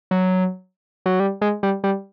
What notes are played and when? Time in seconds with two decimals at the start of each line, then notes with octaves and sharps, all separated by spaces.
0.11 F#3
1.06 F#3
1.20 G3
1.41 G#3
1.63 G3
1.84 G3